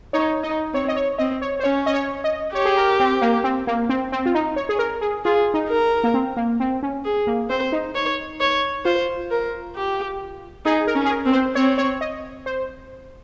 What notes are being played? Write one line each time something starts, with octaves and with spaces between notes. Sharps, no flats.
D#4 C#5
D#4 D#5
C4 C#5
D#5
C#5
C4 D#5
C#5
C5
C#4 C#5
D#5
C#5
D#5
G4 C#5
G#4
A#4
C4
A#3
C4
A#3
C4
C4
F4
D#4
C#5
G#4
A#4
G#4
F4 G#4
D#4
A#4
A#3
C4
A#3
C4
C#4
G#4
A#3
C4 C5
D#4
C#5
C#5
F4 C5
A#4
G4
D#4 G#4
A#4
C#4
G#4
A#4
C4
C5
C4 C#5
C#5
D#5
C5